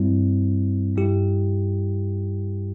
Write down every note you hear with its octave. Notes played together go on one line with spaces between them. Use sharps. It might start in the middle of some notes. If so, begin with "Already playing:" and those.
Already playing: G2 G3 C4 E4
G2 G3 E4 G4